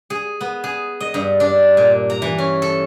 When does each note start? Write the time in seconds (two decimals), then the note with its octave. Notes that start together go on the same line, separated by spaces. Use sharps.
0.10 G#4
0.41 B3
0.64 G#4
1.00 D#5
1.14 G2
1.40 D4
1.77 A#2
2.10 A#5
2.22 E3
2.38 C#4
2.62 A4